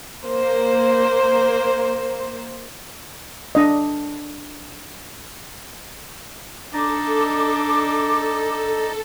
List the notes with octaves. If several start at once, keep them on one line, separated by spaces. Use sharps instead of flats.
A#3 C5
D4 D#5
D4 D#4 A4 D5 D#5 D6